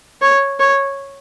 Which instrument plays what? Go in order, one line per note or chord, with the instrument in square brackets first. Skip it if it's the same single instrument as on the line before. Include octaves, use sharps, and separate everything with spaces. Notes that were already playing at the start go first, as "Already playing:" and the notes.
[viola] C#5
C#5